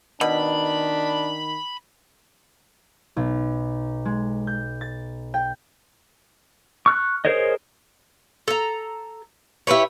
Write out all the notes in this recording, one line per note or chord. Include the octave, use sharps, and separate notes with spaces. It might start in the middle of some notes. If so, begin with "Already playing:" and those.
B2 D#3 D4 B5
B1
G#3
G6
A6
G5
C#6 F6 F#6
G#4 A#4 C5 C#5 D#5
A4 A#5
E4 G4 B4 C#5